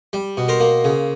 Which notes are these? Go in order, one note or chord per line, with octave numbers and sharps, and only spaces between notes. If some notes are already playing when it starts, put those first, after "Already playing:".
G3
B2
A#4 C5
A#3
C#3